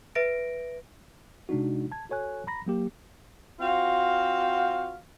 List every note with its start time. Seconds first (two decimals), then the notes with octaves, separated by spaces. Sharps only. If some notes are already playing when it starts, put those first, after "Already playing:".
0.15 B4 E5 A#6 D7
1.49 C3 G#3 D4 D#4 F#4
1.92 A5 G#6
2.10 F#4 A4 C#5 G#5 F#6
2.47 A#5 B5 A#6
2.66 F#3 A#3 G4
3.60 C4 F4 F#4 F5